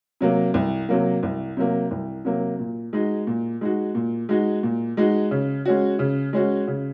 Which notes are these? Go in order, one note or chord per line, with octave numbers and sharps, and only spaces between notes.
C3 F#3 A#3
C2
C3 F#3 A#3
C2
C3 F#3 A#3
C2
C3 F#3 A#3
A#2
G#3 D#4 F#4
A#2
G#3 D#4 F#4
A#2
G#3 D#4 F#4
A#2
G#3 D#4 F#4
C#3
G#3 C#4 F#4
C#3
G#3 C#4 F#4
C#3